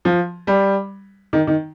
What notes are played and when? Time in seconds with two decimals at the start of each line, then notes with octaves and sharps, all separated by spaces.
0.05 F3
0.47 G3
1.33 D#3
1.47 D#3